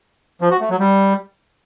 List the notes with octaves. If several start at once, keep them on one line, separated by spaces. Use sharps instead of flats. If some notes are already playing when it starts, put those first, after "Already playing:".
F3
F#4
A3
F#3
G3